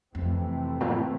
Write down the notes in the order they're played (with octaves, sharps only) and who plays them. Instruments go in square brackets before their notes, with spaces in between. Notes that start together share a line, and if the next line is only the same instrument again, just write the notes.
[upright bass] F2 [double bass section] C3 E3 A3 C4
[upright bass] A#2
A2